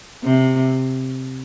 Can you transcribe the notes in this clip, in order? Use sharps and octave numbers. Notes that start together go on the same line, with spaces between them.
C3